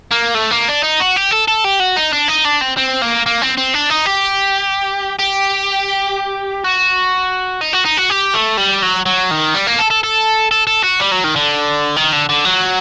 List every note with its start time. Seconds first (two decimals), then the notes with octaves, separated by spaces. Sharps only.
0.11 A#3
0.35 A3
0.51 A#3
0.68 D4
0.83 D#4
1.00 F#4
1.16 G4
1.31 A4
1.48 A4
1.65 G4
1.80 F#4
1.96 D#4
2.13 D4
2.28 D#4
2.45 D4
2.61 C4
2.77 C4
3.02 A#3
3.26 A#3
3.42 C4
3.57 C4
3.74 D4
3.90 D#4
4.06 G4
5.19 G4
6.64 F#4
7.61 D#4
7.73 F#4
7.85 D#4
7.97 F#4
8.10 G4
8.34 A3
8.57 G3
8.82 F#3
9.06 F#3
9.31 D#3
9.54 G3
9.67 A#3
9.79 A4
9.90 A4
10.03 A4
10.51 A4
10.67 A4
10.83 F#4
11.00 G3
11.11 F#3
11.24 D#3
11.36 D3
11.96 D#3
12.13 D3
12.29 D3
12.45 F#3